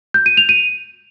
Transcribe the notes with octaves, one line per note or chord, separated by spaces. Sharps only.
G6
D#7
F7
D#7